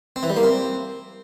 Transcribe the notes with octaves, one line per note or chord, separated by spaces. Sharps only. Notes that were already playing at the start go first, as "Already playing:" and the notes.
C4
E3
G3
A#3
C4